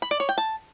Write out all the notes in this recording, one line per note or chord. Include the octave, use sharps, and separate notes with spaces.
B5
D5
C#5
G5
A5